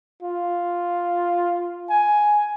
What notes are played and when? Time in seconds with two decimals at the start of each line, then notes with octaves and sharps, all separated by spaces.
0.22 F4
1.90 G#5